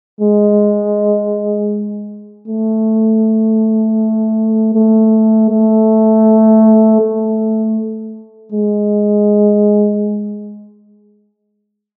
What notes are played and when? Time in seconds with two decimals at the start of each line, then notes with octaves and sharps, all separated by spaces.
0.21 G#3
2.48 A3
4.75 A3
5.50 A3
7.01 A3
8.52 G#3